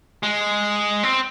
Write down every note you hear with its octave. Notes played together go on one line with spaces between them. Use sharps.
G#3
C4